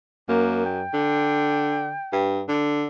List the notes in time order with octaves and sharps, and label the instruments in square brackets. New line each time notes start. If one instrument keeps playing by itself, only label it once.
[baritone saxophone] F#2 [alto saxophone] A#3
[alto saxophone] G5
[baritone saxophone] D3
G2
D3